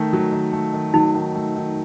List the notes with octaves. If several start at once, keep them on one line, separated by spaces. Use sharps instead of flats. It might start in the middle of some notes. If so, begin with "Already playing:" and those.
Already playing: D#3 A3
F#3
D#3
A3
D#3
F#3 D#4
D#3
A3
D#3